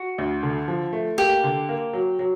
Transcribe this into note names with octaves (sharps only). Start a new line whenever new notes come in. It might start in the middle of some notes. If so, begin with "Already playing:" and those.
Already playing: F#4
D2
D3
F3
A3
A#3 G4
D3
A#3
F#3
F#3